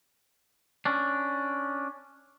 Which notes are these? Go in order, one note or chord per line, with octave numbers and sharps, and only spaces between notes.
C#4 D4